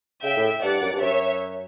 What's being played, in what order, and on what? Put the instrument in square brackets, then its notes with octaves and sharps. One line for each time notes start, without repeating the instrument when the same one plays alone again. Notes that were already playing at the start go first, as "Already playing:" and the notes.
[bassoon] C#3 [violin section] E5 G5
[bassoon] A2
[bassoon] G2 [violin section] D5 F#5
[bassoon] F#2
G2
[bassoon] F#2 [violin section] C#5 E5